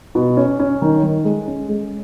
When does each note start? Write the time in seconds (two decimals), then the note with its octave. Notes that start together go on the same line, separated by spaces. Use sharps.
0.15 B2
0.37 C#4
0.59 C#4
0.82 D#3
1.03 D#3
1.24 G#3
1.47 C#4
1.69 G#3